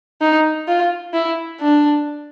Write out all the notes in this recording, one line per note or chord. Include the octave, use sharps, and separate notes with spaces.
D#4
F4
E4
D4